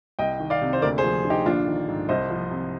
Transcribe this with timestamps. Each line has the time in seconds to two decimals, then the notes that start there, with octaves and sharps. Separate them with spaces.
0.19 C2 D#5 G5
0.40 D#3
0.50 D5 F5
0.62 C3
0.73 C5
0.82 D2 A#4 D5
0.98 G#4 C5
1.04 F3
1.25 D3
1.30 D#4 G4
1.46 A#1 D4 F4
1.67 D#3
1.88 G#2
2.09 C2 C5 D#5
2.30 F3
2.51 C3